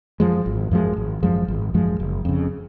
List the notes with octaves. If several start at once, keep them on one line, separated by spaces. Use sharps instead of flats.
F#2 F3 G#3
G#1
F#2 F3 G#3
G#1
F#2 F3 G#3
G#1
F#2 F3 G#3
F#1
F2 C#3